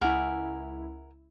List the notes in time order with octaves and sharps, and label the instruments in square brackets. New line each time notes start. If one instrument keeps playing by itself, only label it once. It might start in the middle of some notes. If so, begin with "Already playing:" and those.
[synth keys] C#2 E4 [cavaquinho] A#4 F#5 G#5